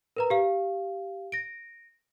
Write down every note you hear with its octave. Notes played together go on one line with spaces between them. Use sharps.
A#4 B4 A#5
G4 F5
A#6 D7